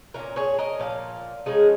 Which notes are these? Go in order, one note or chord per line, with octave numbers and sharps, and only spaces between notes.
A#2 A#3 C#4 F4 A#4
G#4 C#5
A#4 D#5
A#2 F3 F5
C#3 F3 G#3 C#4 D#4 G#4